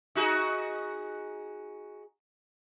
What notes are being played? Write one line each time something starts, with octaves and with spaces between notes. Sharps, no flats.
D#4 F#4 G#4